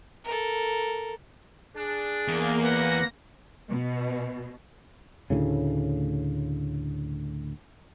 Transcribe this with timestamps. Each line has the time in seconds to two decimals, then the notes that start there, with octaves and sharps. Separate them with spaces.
0.25 A4 A#4
1.76 D4 G#4
2.28 E2 A#3
2.63 C#4 G4 B4 F#5 A#6
3.69 B2
5.30 D2 A2 C#3